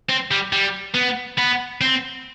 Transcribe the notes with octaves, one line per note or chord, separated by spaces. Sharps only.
C4
G3
G3
B3
B3
C4